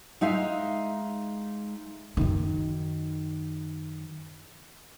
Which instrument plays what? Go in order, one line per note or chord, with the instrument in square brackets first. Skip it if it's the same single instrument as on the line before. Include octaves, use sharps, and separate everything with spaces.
[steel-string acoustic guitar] G#3 D#4 E5 F5
[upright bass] F#2 D#3